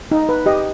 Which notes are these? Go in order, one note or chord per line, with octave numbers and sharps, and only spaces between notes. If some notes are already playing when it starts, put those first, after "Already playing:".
D#4
B4
G4 D#5